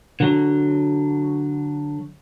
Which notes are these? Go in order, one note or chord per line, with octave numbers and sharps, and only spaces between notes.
D3 F#3